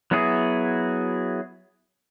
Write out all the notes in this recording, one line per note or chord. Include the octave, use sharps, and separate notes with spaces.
F#3 B3 E4 F#4 G#4